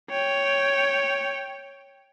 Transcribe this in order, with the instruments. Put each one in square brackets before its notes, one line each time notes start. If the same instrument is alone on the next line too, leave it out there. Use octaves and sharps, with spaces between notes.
[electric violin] C#5 G5